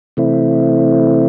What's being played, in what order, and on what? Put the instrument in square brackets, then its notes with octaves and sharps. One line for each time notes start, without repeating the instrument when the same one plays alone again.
[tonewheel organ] C3 E3 A3 C4 E4